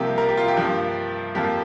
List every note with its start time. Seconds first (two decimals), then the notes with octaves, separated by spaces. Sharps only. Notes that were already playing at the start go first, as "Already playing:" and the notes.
Already playing: C2 C3 F3 A#3 G4
0.18 A#4
0.29 G4
0.37 F4
0.48 G4
0.57 G2 F3 A#3
1.35 F2 F3 A#3 G4